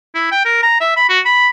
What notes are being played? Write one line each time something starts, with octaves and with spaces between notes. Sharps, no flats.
E4
G5
A#4
A#5
E5
B5
F#4
B5